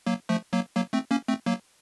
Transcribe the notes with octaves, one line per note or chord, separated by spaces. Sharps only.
F#3 A#3
F3 A3
F#3 A#3
F#3 A#3
A3 C4
A#3 C#4
A3 C4
F#3 A#3